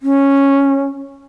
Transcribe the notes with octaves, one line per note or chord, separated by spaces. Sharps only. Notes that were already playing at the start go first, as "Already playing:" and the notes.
C#4